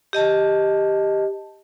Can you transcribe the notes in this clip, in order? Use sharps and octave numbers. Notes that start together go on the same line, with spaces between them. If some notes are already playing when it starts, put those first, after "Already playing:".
G4 D#5 A5